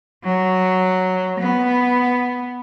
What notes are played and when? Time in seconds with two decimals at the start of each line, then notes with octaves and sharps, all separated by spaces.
0.23 F#3
1.39 B3